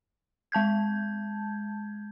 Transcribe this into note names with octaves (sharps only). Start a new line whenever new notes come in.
G#3 A5 G6 G#6